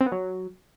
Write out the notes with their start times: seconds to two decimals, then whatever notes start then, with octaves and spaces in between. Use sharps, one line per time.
0.01 C4
0.06 B3
0.12 F#3